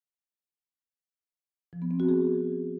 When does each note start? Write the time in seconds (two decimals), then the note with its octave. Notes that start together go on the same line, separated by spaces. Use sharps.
1.73 F3
1.82 B3
1.91 C4
2.00 F#4
2.09 G#4